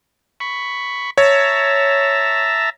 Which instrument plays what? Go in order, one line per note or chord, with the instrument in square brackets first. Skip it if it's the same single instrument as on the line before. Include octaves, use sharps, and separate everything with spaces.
[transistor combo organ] B5 C#6
[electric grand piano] C#5 [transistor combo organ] E5 A5 A#5